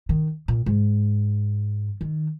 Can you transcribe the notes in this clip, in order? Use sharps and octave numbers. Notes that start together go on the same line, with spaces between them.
D#3
A#2
G#2
D#3